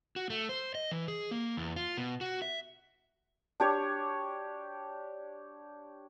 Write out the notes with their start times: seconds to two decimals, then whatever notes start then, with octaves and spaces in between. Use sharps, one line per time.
0.16 F#4
0.30 A3
0.49 C5
0.75 D#5
0.91 E3
1.08 G#4
1.31 A#3
1.57 E2
1.76 F4
1.97 B2
2.21 F#4
2.42 E5
3.60 D4 G4 C#5